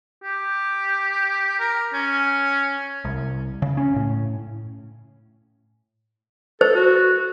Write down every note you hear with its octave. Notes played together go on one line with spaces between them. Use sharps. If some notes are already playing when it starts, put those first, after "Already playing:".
G4
A#4
C#4
C2
C#3
C#4
A2
A4 C5
F#4